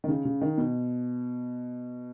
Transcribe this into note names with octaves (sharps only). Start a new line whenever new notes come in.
D#3
C#3
C#3
D#3
B2